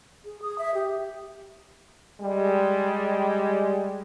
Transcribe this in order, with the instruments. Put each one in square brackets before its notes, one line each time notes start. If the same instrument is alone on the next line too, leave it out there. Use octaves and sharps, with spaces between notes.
[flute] G#4
D#6
E5
G4
[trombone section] G3 G#3